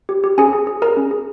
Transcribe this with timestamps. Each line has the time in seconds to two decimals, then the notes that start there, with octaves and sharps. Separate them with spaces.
0.09 G4
0.24 G4
0.38 C#4 G#4 G#5
0.53 G#4
0.67 G#4
0.82 G#4 A#4 A#5
0.97 C#4
1.11 G#4